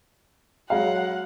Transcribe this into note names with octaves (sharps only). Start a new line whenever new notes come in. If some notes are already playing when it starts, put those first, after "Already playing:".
F#3 G#3 F5 F#5